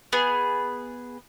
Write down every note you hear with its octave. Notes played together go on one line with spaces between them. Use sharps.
B3 G#4